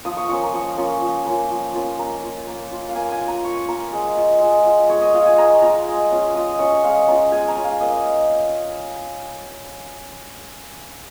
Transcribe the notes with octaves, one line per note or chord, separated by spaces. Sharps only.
F3 D#6
C#6
A#3 C#4 F4 C#6
A#5
F3 C#6
A#3 C#4 F4
F3
A#3 C#4 F4
F3
A#3 C#4 F4
A#3 A#5
F4
A#3
F4
F5
A#3 G#5
G#5
F4
A#5
A#3 C#6
F4 A#5
G#3
F4
G#3
F4
G#3 C#5
D#5
F4 F5
G#5
G#3 A#5
F4 A#5
G#3
C#4 F4
G#3 D#6
C#4 F4 C#6
G#3 F5
C#4 F4 A#5
G#3 G#5
A#5
C#4 F4
F5
A#3 D#5